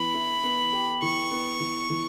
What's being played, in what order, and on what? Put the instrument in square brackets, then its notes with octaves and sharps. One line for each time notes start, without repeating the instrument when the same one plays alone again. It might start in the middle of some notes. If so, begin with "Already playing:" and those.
Already playing: [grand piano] E3 B3 [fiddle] B5
[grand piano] E4
B3
G4
[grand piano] E3 [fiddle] C#6
[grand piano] B3
E3
E3